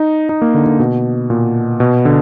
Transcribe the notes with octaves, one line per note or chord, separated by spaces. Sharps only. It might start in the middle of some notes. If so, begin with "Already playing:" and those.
Already playing: D#4
D#4
A#3
D3
D3
B2
A#2
B2
D3